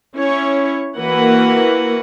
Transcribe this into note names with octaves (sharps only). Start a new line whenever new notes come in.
C#4 E4 C#5
E3 A#3 F#4 A#4 B4 F#5